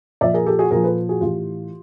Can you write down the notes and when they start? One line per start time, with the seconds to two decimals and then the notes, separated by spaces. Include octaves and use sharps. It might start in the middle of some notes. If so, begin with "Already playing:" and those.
0.21 A#2 F3 D5 E5
0.34 G#4 A#4
0.46 G4 A4
0.59 F#4 G#4
0.71 A#2 F3 G#4 A#4
0.84 A4 B4
1.09 F#4 G#4
1.21 A2 E3 F4 G4